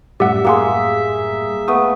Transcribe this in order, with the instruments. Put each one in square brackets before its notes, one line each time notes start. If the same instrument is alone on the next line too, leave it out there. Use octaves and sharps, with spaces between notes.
[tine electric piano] F#2 A2 G3 [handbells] G4 F#5 [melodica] E5
[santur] A#3 G#4 [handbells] G4 F#5 C6
[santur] A3 B3 [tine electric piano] D#6